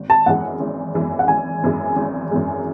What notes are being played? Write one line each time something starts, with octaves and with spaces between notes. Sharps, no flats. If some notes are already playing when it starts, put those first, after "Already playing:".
Already playing: G#1
A5
F#2 E3 G#3 F#5
G#1
F#2 E3 G#3
F#5
G#1 G#5
F#2 E3 G#3
G#1
F#2 E3 G#3